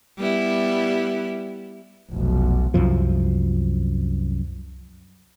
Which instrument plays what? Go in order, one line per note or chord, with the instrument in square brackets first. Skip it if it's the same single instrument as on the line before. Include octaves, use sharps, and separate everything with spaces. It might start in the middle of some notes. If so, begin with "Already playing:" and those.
[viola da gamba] G3 B3 E4
[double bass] F1 B1
[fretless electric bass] C2 F#2 F3